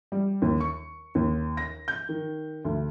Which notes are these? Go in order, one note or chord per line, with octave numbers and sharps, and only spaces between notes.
G3
D#2
C#6
D#2
A#6
G6
D#3
D2